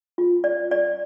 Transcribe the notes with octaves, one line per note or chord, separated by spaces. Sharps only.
F4
D5
D5